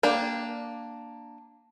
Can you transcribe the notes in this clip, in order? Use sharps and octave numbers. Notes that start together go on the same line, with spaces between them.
A#3 D4 G5